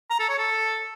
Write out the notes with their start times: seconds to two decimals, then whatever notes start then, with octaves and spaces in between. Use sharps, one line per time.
0.10 A#5
0.20 A4
0.29 C#5
0.38 A4